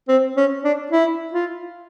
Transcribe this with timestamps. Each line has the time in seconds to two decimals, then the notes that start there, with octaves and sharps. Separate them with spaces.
0.08 C4
0.37 C#4
0.64 D4
0.92 E4
1.33 F4